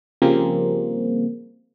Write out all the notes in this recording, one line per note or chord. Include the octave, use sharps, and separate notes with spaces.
C#3 F3 G3 A#3 C4 G#4